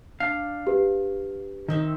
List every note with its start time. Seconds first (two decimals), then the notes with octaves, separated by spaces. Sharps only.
0.20 D4 F5
0.67 G4 B4
1.68 D#3 C4 D#4 E5